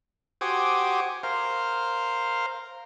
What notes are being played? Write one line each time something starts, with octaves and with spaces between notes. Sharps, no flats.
F#4 G4 C5 G#5 D6 D#6
A#4 C5 F5